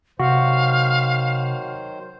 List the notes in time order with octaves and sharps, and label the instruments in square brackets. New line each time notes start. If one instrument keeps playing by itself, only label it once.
[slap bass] C3 [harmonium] D#3 F#3 C5 [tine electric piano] F#4 [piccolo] F5